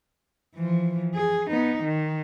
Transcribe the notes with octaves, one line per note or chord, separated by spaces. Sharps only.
E3 F3
G#4
B3 D#4
D#3